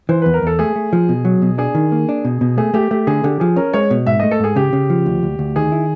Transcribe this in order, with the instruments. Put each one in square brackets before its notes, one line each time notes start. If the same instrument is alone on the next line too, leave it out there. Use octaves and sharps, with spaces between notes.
[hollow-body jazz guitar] E3 [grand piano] C5
[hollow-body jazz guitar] E2 [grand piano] B4
[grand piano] A#4
[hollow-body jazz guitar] E2 [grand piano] A4
[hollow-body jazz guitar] A3 [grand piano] G#4
[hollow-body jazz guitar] A3
F3
B2
F#3
B2
[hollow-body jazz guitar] D4 [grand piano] G#4
[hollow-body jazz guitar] D#3
A#3
D4
B2
B2
[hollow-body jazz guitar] A3 [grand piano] G#4
[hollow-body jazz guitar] A3 [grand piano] G4
[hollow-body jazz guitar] A3 [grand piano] G4
[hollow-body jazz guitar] D3 [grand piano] G#4
[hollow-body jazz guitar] D3 [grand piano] G4
[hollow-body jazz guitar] F3 [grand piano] G#4
[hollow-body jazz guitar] C#4 [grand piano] A#4
[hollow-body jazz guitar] G#3 [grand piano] C#5
[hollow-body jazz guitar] B2
[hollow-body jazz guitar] G#2 [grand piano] E5
[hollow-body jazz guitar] A3 [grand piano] D#5
[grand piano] A4
[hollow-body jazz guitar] G#2 [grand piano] G#4
[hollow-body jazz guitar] C#3 [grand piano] G4
[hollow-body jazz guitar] C#3
F3
D2
D2
D2
[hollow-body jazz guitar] D#3 [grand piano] G#4
[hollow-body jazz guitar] E4